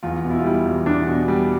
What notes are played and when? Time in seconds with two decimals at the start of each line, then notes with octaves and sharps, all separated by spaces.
0.03 E2 F4
0.24 B2
0.31 E4
0.39 F4
0.44 G3 E4
0.65 E2
0.86 E2 D4
1.07 B2
1.28 G3